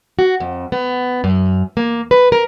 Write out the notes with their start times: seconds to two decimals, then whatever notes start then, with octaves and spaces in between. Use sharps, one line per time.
0.19 F#4
0.40 F2
0.72 B3
1.24 F#2
1.77 A#3
2.11 B4
2.32 A#4